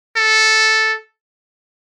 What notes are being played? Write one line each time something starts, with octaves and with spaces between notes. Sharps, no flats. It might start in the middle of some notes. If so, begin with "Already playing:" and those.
A4